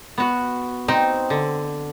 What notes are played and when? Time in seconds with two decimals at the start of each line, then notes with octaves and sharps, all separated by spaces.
0.18 B3 F#4
0.88 C4 D#4
1.30 D3